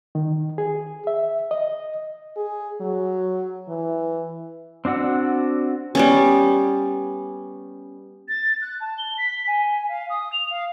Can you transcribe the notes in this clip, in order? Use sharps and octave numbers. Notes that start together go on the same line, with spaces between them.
D#3
G#4
E5
D#5
G#4
F#3
E3
C4 D4 F#4 F#5 E6
G3 B3 C#4
A6
F#6
A5
G7
B6
G#5
F5
D#6
F7
F5